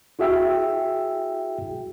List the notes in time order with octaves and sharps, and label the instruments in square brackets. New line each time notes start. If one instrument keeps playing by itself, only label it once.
[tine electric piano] E4 F#4 G#4 E5 G5 E6